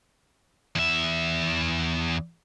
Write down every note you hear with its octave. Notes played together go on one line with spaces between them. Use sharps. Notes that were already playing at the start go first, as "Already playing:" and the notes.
E2 E5